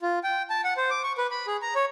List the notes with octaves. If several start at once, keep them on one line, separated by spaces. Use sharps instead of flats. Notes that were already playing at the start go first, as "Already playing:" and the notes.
F4
G5
A5
F#5
C5
D6
C#6
B4
B5
G#4
A#5
C#5